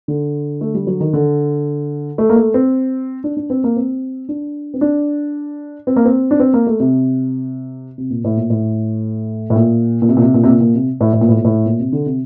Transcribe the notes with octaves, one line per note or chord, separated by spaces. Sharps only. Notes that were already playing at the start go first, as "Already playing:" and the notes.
D3
A3
G3
F#3
D#3
D3
A3
A#3
A3
C4
D4
D4
C4
A#3
C4
D4
C4
D4
C4
A#3
C4
D4
C4
A#3
A3
C3
C3
A#2
A2
A#2
A2
A2
A#2
A#2
C3
A#2
C3
A#2
C3
A#2
A#2
C3
A2
A2
A#2
A2
A#2
A2
A#2
C3
D3
C3